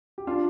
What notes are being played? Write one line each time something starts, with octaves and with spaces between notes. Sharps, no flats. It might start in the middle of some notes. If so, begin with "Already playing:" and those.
G4
D4 F4